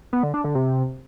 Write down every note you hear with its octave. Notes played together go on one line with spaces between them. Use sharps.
B3
D3
D4
D3
C3